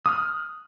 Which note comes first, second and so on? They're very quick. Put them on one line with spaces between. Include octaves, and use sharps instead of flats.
D#6 F6 F#6